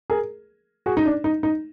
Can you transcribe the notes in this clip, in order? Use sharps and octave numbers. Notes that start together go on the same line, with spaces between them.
G#4 A#4
F#4 G#4
D#4
D4
D#4
D#4